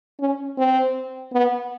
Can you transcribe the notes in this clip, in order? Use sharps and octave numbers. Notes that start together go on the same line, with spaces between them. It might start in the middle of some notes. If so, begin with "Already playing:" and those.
C#4
C4
B3